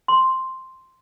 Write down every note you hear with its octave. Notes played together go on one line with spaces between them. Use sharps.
C6